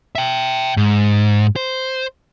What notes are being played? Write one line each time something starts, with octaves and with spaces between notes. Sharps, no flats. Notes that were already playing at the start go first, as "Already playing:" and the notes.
E5 G5
G#2
C5